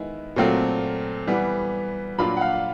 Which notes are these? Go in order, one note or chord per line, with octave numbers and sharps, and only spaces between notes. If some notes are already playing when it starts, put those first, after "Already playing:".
Already playing: D#3 G#3 B3 E4
A#2 F#3 A3 C4 F4
E3 G3 B3
A#2 F#3 A#3 D4 F4 B5
F#5
F5